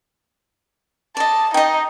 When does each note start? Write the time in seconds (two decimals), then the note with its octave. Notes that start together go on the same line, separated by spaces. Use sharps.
1.17 D5 D#5 A5
1.54 D#4 D#5 G5